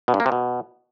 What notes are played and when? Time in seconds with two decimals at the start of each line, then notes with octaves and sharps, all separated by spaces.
0.08 B2
0.14 G2
0.20 A#3
0.26 C3
0.32 B2